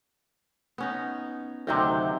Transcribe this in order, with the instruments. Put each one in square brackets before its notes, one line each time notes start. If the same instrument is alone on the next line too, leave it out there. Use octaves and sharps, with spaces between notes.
[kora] B3 C#4 D#4
[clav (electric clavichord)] D2 C3 [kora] D#3 F#3 C4